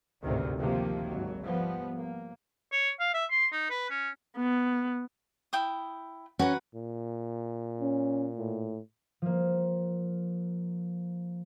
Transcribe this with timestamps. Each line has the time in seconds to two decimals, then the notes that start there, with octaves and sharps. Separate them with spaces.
0.22 A1 D2 G#2 C3 D#3
0.59 C3 D#3 F3 A#3
1.06 G#1 F#3
1.44 F3 G3 B3
1.94 A#3
2.72 C#5
3.00 F5
3.14 E5
3.30 C6
3.52 D#4
3.70 B4
3.90 C#4
4.37 B3
5.53 E4 G5 D#6
6.39 C#4 F#4 B4 A#5
6.75 A#2
7.81 C#4
8.38 A2
9.22 F3 A#3